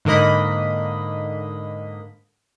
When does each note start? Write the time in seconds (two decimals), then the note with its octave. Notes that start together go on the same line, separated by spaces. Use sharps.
0.05 G#2 D3 A#3 D#5 B5